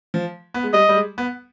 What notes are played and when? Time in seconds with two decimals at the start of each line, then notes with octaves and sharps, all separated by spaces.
0.14 F3
0.54 B3
0.63 G#3
0.73 G3 D#5
0.89 G3
0.96 G#3
1.18 B3